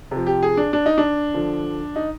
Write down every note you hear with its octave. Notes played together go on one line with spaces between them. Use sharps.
C3 F3
G4
G#4
D4
D4
D#4
D4
D3 F3
D#4